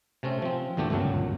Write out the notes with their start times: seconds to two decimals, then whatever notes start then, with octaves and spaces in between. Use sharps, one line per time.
0.23 C3 A3 C4 C#4
0.42 F3 C4
0.77 E2 A#2 D3 A3 G4
0.90 G1 C#2 F#2 A#2 F#3